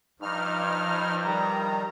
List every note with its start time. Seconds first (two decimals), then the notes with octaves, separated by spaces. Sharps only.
0.22 G2 F3 D#4 F6
1.25 D#3 G3 A#5